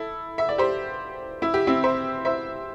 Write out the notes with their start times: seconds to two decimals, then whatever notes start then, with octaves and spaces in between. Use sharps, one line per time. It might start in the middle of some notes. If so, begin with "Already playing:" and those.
Already playing: E4 A4
0.38 E5
0.49 D5
0.58 G4 C5
1.42 E4
1.54 G4
1.67 C4 E4
1.84 C5 E5
2.25 C5 E5